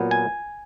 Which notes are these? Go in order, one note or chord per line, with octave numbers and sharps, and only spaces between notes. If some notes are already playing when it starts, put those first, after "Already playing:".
Already playing: A#2 F#3 B3
G#5